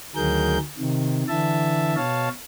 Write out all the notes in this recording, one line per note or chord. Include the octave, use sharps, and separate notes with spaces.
D2 D#3 F#3 G#4 A#4 G6
C3 D#3
D3 E3 E5 A5
B2 C#5 F5 A5